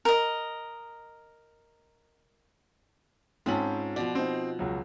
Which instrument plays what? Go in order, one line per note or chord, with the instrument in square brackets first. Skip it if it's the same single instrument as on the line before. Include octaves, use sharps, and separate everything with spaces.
[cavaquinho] A#4 D#5
[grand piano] G#2 C#4 A5 [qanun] C4 F4 B5
[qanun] B2 F3 [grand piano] D5
[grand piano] C4 D#4
C#2 F#3